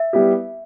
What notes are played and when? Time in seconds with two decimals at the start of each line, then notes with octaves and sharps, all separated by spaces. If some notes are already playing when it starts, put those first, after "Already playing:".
Already playing: E5
0.13 G3 B3 E4 G4